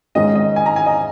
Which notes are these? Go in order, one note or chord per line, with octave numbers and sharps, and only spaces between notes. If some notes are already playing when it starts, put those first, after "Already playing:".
G#2 D#3 G#3 C#4 D#5
D#5
G#5
A#5
G#5
D#5